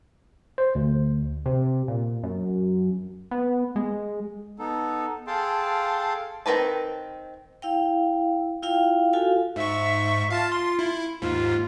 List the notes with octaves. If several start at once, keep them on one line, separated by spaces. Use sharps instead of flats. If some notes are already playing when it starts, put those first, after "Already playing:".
C5
D2
C3
A#2
F#2
B3
G#3
B3 D#4 A4
G#4 A4 F5 G5 A5 C6
D#3 C4 A#4 B4 A5
E4 F5 G5
E4 F4 F5 G5
F4 F#4 A4 F5 G#5
G#2 E5 C#6
F4 F5 A5 A6
C6
E4
D#2 G#2 F4